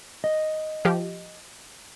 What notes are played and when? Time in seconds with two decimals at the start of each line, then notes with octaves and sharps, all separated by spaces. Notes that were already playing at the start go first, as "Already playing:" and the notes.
0.24 D#5
0.85 F3 G4